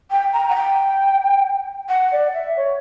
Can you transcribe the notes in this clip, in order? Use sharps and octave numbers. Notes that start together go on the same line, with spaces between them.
G5
A#5
F#5
G5
F#5
D5
E5
C#5